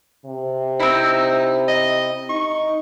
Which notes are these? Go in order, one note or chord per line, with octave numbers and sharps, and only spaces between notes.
C3
C4 D#4 E4
D#5
D#4 C#6